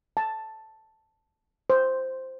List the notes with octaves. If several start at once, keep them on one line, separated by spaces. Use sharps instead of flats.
A5
C5